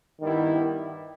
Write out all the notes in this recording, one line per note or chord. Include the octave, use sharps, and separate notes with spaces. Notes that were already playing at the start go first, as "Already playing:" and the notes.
G2 D#3 G3 B3 E4 G4